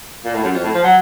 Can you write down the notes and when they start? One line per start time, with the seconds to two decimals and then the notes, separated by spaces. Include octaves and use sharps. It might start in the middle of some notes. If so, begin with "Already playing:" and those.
0.25 A#2
0.34 A2
0.44 F#2
0.54 F2
0.64 A2
0.74 F3
0.84 F#3